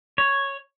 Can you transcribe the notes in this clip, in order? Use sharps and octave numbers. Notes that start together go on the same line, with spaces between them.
C#5